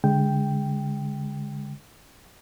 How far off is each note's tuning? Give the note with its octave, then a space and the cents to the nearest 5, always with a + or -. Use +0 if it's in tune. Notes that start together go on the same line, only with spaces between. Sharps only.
D3 -40 G#3 -15 G5 +0